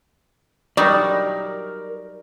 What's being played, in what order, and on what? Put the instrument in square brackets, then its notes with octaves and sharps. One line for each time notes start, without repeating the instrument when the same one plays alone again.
[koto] F#3 G3 D#4 [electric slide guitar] A#4 D5